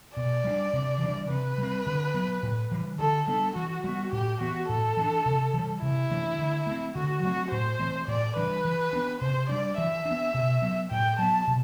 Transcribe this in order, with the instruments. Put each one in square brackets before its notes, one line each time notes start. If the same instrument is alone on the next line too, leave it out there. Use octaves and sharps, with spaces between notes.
[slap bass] B2 [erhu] D5
[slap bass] G3 D4
C3
E3 G3 D4
[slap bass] C3 [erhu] B4
[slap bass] G3 C4
D3
F#3 B3
A2
E3 G3
[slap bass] D3 [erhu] A4
[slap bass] G3 B3 D4 [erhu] A4
[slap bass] E3 [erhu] F#4
[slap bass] G3 B3 [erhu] F#4
[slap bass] A2 [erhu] G4
[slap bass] E3 B3 [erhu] F#4
[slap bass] A2 [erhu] A4
[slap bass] E3 B3 D4
C3
E3 G3
[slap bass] C3 [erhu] E4
[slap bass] E3 A3 D4
D3
A3 C4
[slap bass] D3 [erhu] F#4
[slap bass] F#3 A3 C4 [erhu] F#4
[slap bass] A2 [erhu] C5
[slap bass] E3 A3 C4
[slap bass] A2 [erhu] D5
[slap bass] E3 G3 D4 [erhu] B4
[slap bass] E3
B3 D4
[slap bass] C3 [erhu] C5
[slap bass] G3 D4 [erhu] D5
[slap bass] E3 [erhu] E5
[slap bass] D4
B3
B2
F#3 B3
[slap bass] A2 [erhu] G5
[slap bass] F#3 B3 [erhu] A5
[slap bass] B2